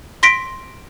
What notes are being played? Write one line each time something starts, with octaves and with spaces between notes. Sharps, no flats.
C6 A#6 B6 D7